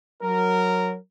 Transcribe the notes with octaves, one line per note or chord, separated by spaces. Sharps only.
F#3 A#4